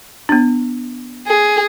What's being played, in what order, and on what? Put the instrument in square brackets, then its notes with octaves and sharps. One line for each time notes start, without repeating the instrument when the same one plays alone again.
[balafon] B3 D4
[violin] G#4